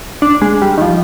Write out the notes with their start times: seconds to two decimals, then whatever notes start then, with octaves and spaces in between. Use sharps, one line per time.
0.22 D4
0.42 G#3
0.62 G3
0.78 D#3
0.82 F3